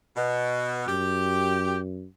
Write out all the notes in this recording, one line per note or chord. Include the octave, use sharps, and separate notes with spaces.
B2
F#2 G4